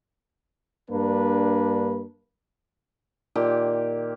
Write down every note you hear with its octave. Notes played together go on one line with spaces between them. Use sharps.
G2 A#3 D4 B4
A#2 D#3 G4